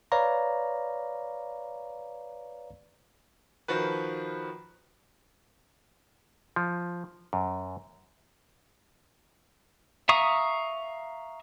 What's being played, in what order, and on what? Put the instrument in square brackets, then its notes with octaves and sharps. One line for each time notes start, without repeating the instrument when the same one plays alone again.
[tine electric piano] B4 C#5 D5 F5 A#5
[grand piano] D#3 F3 F#4 B4
[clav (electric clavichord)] F3
F#2
[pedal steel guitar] E5 F5 A#5 C#6 D#6